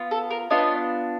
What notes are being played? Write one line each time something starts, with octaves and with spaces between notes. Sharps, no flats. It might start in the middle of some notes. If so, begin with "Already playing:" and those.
Already playing: B3 F4
A4
A#4
B3 D4 F4 C#5 D#5